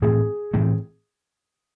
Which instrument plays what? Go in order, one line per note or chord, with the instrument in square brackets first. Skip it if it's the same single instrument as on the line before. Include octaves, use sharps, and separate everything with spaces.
[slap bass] A2 E3 A3 C4 [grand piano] G#4
[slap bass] A2 E3 A3 C4